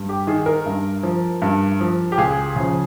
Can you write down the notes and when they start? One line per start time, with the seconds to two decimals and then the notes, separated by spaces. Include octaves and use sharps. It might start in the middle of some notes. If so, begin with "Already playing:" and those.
Already playing: G2
0.09 G4
0.27 D#3 G#4
0.46 A#4
0.66 G2
1.03 F3
1.42 G2
1.81 F3
2.12 G4
2.17 C#2 G#4
2.56 C#3 F3